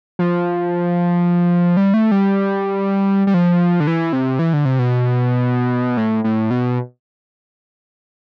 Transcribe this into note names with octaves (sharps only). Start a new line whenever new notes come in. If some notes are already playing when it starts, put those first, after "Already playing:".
F3
G3
A3
G3
G3
F3
D3
E3
C3
E3
D3
C3
B2
A2
A2
B2